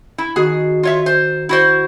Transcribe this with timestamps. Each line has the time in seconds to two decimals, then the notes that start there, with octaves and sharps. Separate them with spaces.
0.18 E4
0.36 D#3 F#4 G#4
0.83 F4 C#5 E5
1.06 C5
1.49 E4 F#4 C5